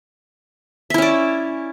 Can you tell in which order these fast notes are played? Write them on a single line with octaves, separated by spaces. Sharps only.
E5 E4 C#4 D5